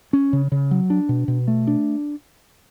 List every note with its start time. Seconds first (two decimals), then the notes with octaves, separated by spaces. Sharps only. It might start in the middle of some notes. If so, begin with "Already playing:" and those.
0.13 C#4
0.33 C#3
0.52 C#3
0.71 F#3
0.90 D4
1.09 B2
1.28 B2
1.48 A3
1.67 D4